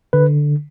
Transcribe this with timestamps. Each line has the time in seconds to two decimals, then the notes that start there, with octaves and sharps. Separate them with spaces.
0.13 D3 B4